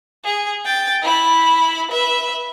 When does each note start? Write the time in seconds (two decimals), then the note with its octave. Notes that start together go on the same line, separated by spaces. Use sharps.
0.24 G#4
0.65 G5 A6
1.02 E4 B5
1.91 B4 E5